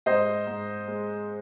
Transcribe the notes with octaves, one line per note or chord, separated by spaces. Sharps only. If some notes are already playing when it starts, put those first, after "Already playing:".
G#2 C5 D#5
G#2
G#3